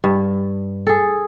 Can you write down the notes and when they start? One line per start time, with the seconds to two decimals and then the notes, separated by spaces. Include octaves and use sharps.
0.04 G2
0.87 G#4 A4